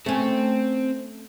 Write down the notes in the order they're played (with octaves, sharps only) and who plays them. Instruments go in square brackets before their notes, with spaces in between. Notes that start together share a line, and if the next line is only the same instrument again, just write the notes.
[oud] A3 C#4 [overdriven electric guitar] C4